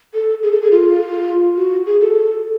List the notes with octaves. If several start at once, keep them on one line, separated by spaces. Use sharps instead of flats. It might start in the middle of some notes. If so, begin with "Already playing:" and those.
A4
G#4
A4
G#4
F4
F#4
G#4
A4